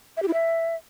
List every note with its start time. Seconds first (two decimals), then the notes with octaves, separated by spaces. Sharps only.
0.17 E5
0.22 G4
0.28 E4
0.33 E5